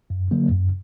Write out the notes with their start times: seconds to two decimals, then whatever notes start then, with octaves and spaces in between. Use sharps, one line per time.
0.10 F#2
0.31 D3 F#3 A#3
0.51 F#2